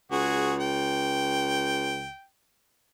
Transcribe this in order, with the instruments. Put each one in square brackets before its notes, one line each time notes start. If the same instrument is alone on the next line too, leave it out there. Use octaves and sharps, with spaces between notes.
[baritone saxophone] C#2 [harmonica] F#4 G#4
[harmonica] G5